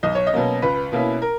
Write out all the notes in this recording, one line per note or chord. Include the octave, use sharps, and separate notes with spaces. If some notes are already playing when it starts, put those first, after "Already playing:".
B1 D#5
C#5
D#5
B2 F#3 A#3 C#4
C#2 B4
B2 A#3 C#4 E4
A#4